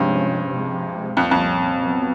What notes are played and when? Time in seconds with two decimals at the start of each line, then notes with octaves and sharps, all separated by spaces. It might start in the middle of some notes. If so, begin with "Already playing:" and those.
Already playing: G2 C3 F3 G#3 C#4
0.51 C3 F3 G#3
1.17 C2 F2 A#2 F3 A#3 C#4
1.31 F2
1.82 F#3 B3